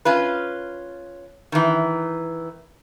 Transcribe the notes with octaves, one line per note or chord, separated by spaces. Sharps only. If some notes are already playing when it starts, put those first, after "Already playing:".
C#4 F4 B4
D#3 E3